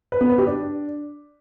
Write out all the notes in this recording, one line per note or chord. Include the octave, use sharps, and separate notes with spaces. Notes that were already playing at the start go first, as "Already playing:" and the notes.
B4
B3
B4
G4
D4